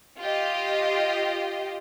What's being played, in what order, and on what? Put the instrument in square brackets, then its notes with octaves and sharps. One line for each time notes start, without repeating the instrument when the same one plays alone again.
[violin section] F4 G4 D#5